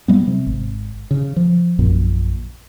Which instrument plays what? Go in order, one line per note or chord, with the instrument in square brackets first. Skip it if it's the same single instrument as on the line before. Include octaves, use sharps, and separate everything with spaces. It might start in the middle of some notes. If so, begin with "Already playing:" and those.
[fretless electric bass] F#3 G3 B3
C3
G#1
C#3
F3
A#1 F#2 A#2